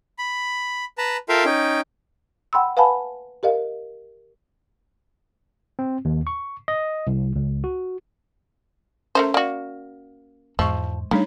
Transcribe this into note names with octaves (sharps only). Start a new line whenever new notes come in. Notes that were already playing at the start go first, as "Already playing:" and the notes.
B5
B4 A5 A#5
F4 A4 A#4 E5 F5 G5
C#4 D#4 G5
F#5 G5 B5 C6 E6
B4 F5 F#5 G#5 A5 B5
G4 A#4 D#5 F5
C4
D#2
C#6
D#5
C2
C#2
F#4
A3 C#4 A#4 C5 E5
A#3 F#4 D5
E2 G#2 F3 G#3 C#6
C#3 G3 A3 D4 D#4 C#5